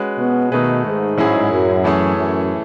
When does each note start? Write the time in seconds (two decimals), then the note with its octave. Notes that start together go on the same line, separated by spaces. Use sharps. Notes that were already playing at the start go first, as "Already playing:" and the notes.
Already playing: G#3 C#4 F#4 B4
0.18 B2
0.52 B2 D#3 A3 D#4 G#4 B4
0.84 G#2
1.17 A2 F#3 C#4 E4 G#4
1.51 F#2
1.84 E3 A3 C#4 G#4 C#5
2.16 F#2